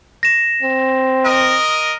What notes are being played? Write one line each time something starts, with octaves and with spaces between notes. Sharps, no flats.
A#6 E7
C4
A#4 D#5